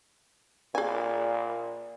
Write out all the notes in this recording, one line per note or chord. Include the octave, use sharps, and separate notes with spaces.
A#2 G#4 G#5